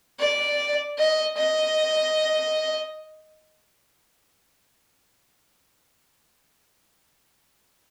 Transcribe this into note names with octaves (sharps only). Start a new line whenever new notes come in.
D5
D#5
D#5